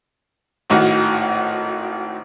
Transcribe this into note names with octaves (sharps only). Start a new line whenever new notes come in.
G#1 A2 D#3 F#4